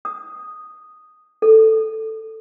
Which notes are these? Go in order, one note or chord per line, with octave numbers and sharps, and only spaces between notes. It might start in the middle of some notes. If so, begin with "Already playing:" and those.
D#6
A4